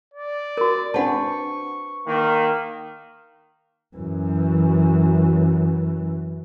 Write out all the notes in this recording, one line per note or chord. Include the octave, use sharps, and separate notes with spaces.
D5
F#4 A#4
C4 D4 B4 F#5 A5 C#6
D#3 A#3
F#2 E3